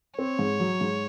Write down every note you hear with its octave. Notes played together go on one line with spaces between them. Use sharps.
C4 C#5
G#2
F#3
G#2